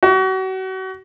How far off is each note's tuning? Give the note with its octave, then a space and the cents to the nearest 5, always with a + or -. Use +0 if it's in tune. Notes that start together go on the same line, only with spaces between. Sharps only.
F#4 +35